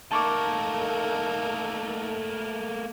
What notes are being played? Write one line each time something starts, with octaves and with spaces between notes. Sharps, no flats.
A3 A#3 D#4 A4 A#4 A5 C#6 D6